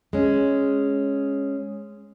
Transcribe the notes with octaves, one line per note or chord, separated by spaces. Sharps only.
G#3 C#4